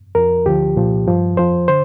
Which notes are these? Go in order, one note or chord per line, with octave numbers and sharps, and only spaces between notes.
F2 F3 A#4
D2 D3 F3 G4
C2 A#2 F3
G2 F3
F2 F3 C5
D3 C5